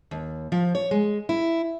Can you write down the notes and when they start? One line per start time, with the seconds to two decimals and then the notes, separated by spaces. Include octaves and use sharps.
0.11 D#2
0.52 F3
0.75 C#5
0.91 G#3
1.29 E4